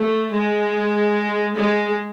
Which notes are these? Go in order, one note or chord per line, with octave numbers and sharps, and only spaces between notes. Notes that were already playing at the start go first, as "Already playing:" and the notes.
Already playing: A3
G#3
G#3